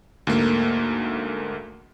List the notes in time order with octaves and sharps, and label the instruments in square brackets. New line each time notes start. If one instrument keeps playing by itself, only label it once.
[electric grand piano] D2 G#2 A3 A#3